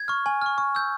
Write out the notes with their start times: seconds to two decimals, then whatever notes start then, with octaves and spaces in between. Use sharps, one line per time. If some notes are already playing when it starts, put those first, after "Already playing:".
Already playing: G#6
0.08 C#6 F6
0.26 G#5
0.42 C#6 F6
0.58 C#6
0.75 E6 G6